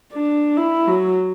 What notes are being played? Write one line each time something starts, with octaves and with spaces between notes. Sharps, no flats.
D4
E4
F#3